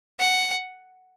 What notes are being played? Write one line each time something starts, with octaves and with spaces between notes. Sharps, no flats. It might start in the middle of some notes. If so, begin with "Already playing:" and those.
F#5